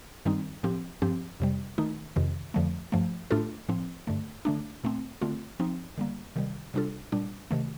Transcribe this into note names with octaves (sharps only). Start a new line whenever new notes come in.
G2 D#3 G3 C4 D#4
A2 F3 C4 G4
G2 F3 C4 G4
F2 C3 G3
D#3 A3 D#4
F2 C3 D#3
F2 D3 F3 A3
G2 F3 A3
A2 A3 D4 F4 A4
A2 F3 C4
G2 D3 A3
D3 A3 D4
A#2 A3 C4
D3 A3 C4 F4
F3 C4 D#4
D3 G3 A#3
C3 D#3 G3
C3 G3 D4 F4 A4
A#2 G3 D4
C3 D#3 A3